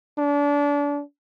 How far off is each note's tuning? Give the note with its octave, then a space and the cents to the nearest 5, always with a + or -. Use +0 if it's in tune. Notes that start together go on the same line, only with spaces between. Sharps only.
D4 -30